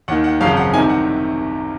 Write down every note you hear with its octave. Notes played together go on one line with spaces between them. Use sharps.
D#2 D#3 F#5
F#5
G#1 F#2 C#3 F3 F5
F#5
C2 C3 D#3 G#5
F#5